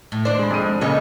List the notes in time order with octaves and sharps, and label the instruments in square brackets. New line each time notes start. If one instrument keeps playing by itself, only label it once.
[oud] A2
[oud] D#2 D4 C5 [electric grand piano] D5
[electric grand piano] G#3 B5
F2 G#3 D#7
[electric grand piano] A#2 C#3 [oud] A4 C#5 D#5